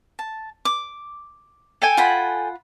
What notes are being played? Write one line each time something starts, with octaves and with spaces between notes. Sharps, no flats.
A5
D6
A4 G5 G#5
F4 F#5 B5